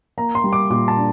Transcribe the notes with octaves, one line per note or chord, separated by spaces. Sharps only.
A#3 A#5
C6
G3
D6
A#2 D6
A5
D4